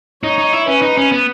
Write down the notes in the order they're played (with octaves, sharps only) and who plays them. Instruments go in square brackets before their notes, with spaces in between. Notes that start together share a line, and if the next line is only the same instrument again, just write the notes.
[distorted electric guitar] D#4 [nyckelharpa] C#5
[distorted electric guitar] D#4
E4
[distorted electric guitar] C#4 [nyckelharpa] B4
[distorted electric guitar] D#4
C#4
B3